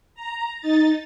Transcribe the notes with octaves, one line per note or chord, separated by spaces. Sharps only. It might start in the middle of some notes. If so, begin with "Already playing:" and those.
A#5
D#4 A6